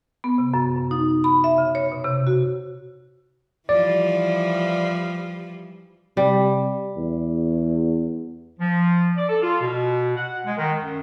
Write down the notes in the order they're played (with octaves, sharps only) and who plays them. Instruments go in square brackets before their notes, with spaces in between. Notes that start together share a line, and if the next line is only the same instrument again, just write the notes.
[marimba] B3
C3
F#2
F#2
D#4
B5
E5
C#3
C#5
B2
C3
F#4
[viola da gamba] E3 F3 G3 [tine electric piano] D5
[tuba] C3 [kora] G3
[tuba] E2
[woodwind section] F3
D5
A4
F4
B2
F#5
G#3
D#3
F#2